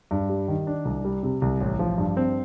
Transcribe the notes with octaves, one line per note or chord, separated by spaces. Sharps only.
G2
G3
D#3
D4
C2
G3
C3
C2
A1
F3
G2
C4